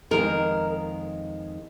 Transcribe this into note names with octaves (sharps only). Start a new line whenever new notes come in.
F2 D#3 G#3 A#4